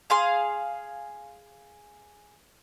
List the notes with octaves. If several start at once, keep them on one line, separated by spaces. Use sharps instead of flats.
G#4 F5 C6